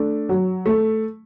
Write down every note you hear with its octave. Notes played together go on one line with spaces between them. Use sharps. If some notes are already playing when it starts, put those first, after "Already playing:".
Already playing: A3 D4
F#3
A3